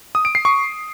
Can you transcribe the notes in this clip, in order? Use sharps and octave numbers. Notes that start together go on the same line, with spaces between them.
D#6
D7
C7
C#6